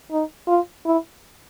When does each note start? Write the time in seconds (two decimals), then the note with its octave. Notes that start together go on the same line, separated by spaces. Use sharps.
0.11 D#4
0.48 F4
0.86 E4